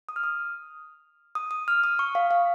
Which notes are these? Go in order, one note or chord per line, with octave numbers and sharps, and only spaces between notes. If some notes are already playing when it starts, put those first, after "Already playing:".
D#6
F6
D#6
D#6
D#6
F6
D#6
C#6
F5
F5